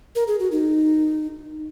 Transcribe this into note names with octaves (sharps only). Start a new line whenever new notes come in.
A#4
G#4
F#4
D#4